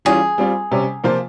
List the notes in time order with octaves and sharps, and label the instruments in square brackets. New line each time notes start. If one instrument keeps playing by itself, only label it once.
[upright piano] E3 G3 C#4 F4 [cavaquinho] G#4
[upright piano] G3 C4 F4
C3 G3 C#4
C3 F3 A#3 F4 C5